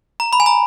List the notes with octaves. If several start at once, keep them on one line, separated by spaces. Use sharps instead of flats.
A#5
B5
G#5
A#5